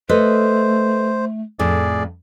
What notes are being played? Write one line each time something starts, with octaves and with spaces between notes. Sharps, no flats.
A3 A4 B4 C5 D#5
F2 A2 G#4 D5